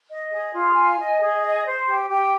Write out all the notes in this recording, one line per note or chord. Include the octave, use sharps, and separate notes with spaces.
D#5
G#4
F4
G#5
D#5
G#4
D#5
C5
G4
G4